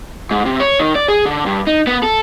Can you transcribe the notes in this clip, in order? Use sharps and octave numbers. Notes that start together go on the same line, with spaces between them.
G#2
C3
C#5
D#3
D5
G#4
D3
G2
D#4
B3
A4